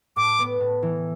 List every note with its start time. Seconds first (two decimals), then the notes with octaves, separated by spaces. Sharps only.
0.16 A2 D6
0.39 B3
0.60 A2
0.82 E3